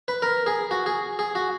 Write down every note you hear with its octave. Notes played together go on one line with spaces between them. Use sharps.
B4
A#4
G#4
F#4
G#4
G#4
F#4